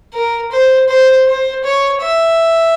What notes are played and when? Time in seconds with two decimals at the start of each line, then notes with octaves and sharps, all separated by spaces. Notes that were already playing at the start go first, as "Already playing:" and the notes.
0.14 A#4
0.52 C5
0.88 C5
1.27 C5
1.64 C#5
2.02 E5